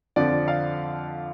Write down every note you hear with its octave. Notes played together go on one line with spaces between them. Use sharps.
F2 D3 F3 D5
F5